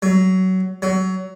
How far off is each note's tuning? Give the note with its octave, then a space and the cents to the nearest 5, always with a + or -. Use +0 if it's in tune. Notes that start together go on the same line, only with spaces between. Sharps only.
F#3 +20
F#3 +25